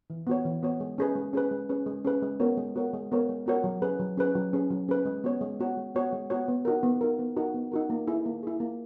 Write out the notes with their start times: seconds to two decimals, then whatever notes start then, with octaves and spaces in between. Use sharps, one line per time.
0.10 E3
0.27 B3 F#4 C#5
0.45 E3
0.63 B3 F#4 C#5
0.80 G#3
0.98 C#4 G#4 B4
1.15 G#3
1.33 C#4 G#4 B4
1.51 G#3
1.69 C#4 G#4 B4
1.86 G#3
2.05 C#4 G#4 B4
2.22 G#3
2.40 B3 F#4 A#4 C#5
2.57 G#3
2.76 B3 F#4 A#4 C#5
2.93 G#3
3.12 B3 F#4 A#4 C#5
3.29 G#3
3.46 B3 F#4 A#4 C#5
3.64 F#3
3.82 C#4 G#4 B4
3.99 F#3
4.17 C#4 G#4 B4
4.35 F#3
4.53 C#4 G#4 B4
4.70 F#3
4.88 C#4 G#4 B4
5.05 G#3
5.24 B3 F#4 C#5
5.41 G#3
5.60 B3 F#4 C#5
5.77 G#3
5.95 B3 F#4 C#5
6.13 G#3
6.30 B3 F#4 C#5
6.48 B3
6.65 D#4 F#4 A#4
6.83 B3
7.01 D#4 F#4 A#4
7.19 B3
7.36 D#4 F#4 A#4
7.54 B3
7.72 D#4 F#4 A#4
7.90 A#3
8.07 E4 G#4
8.26 A#3
8.43 E4 G#4
8.60 A#3